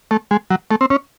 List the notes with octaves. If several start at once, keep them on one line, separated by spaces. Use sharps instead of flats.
A3
G#3
F#3
A3
C4
C#4